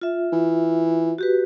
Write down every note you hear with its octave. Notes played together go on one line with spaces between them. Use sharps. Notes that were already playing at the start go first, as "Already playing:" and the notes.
F4 E5
E3
F#4 G4 B4